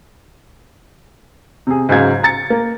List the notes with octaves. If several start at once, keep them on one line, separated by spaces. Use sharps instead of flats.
C3 G#4
G#2 C#3 F#3 F5 G#6
A#5 A6 C#7
A#3